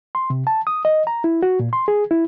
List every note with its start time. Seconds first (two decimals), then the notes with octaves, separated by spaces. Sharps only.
0.15 C6
0.30 C3
0.47 A5
0.67 D#6
0.85 D#5
1.07 A#5
1.24 E4
1.43 F#4
1.60 A#2
1.73 C6
1.88 G#4
2.11 E4